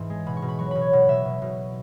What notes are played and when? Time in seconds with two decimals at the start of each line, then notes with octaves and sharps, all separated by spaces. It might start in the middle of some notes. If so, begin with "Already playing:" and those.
Already playing: G#2 E3
0.10 G#3
0.26 B2 B5
0.37 C#6
0.42 B2
0.48 B5
0.59 F#3 C#6
0.71 B2 B5
0.81 C#5
0.93 B2 F#5
1.09 B2 E5
1.25 B2
1.42 B2